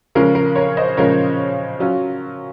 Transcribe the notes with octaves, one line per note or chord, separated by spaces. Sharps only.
C#3 F3 G#3 C#4 A#4
A#4
A#4 C#5
C5 D#5
C#3 F3 G#3 C#4 A#4 C#5
F#3 C#4 F4